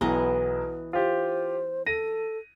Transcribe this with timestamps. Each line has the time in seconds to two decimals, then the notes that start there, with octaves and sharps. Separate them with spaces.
0.01 B1 E3 B3 D#5
0.93 F4 G4 C5
1.86 A4 A#6 D#7